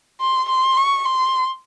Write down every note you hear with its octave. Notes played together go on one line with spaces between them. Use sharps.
C6
C6
C#6
C6